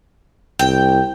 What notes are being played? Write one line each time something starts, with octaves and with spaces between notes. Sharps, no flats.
C2 G5